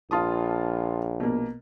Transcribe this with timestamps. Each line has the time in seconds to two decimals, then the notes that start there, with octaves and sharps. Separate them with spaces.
0.11 A#1 F4 A5 D#6
1.20 B2 A#3